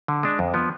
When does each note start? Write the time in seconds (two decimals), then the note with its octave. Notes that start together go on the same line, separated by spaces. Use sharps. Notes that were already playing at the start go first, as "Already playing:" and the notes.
0.08 D3
0.23 G#3 D4
0.39 F2
0.54 F3 B3